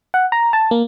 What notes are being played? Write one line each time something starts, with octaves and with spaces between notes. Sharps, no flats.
F#5
A#5
A5
A#3